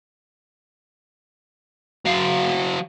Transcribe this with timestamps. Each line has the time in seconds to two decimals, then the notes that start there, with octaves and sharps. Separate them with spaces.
2.05 F#3 F5